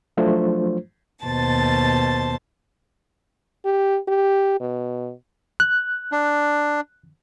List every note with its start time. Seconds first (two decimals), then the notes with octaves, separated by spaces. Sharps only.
0.17 F3 F#3 A3 D4 F4 C5
1.25 D#2 B2 C5 A5 A6
3.65 G4
4.08 G4
4.60 B2
5.60 F#6
6.12 D4